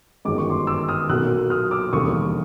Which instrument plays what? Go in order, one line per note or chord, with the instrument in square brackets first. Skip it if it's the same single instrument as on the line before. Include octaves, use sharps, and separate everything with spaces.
[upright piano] G1 F#2 D#3 G#3 D6
C#6
C6 D6
D6 E6
D#6 F6
B1 A#2 F#3 A#3 E6 F#6
D#6 F6
D6 E6
E1 D#2 D3 G3 C#6 D#6